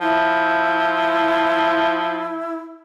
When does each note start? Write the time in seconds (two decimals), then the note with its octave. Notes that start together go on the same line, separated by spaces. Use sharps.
0.01 F3 E4